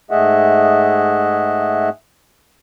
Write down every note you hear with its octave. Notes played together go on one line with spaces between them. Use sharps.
G#2 A3 G#4 D#5 E5 F#5